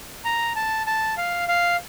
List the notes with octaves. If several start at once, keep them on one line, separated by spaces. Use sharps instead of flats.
A#5
A5
A5
F5
F5